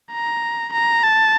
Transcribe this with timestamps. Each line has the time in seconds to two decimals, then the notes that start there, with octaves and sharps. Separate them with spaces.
0.12 A#5
0.73 A#5
1.03 A5